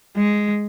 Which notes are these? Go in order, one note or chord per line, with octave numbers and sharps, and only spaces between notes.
G#3